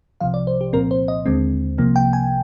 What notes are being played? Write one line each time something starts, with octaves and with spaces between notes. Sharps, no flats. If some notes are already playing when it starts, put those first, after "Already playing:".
C2 C3 F3 F5
D5
C5
G4
C2 A#2 F3 C4 A#4
C5
D#5
D#2 D3 G#3 C4
C2 C3 F3 A#3
G5
G#5